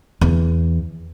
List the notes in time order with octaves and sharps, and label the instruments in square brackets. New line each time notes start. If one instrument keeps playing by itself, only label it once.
[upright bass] E2